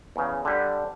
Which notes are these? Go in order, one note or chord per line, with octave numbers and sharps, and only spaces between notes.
E2 C#3
D3 G3